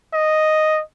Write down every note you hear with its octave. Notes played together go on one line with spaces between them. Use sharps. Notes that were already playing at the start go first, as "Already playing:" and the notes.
D#5